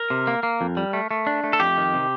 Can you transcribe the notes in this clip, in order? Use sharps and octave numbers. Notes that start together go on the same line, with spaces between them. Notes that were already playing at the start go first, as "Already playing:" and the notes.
Already playing: A#4
C3
A#3
A#3
F2
G3
A3
A3
D4
A3
A4
F2 G4
D#3
C3